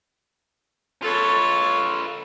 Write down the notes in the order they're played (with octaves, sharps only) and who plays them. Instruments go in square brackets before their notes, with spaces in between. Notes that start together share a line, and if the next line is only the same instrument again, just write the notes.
[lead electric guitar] F4 B4 [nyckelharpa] A4 C#5